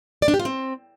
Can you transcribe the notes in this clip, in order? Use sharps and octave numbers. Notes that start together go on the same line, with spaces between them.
D5
D4
G4
F4
C4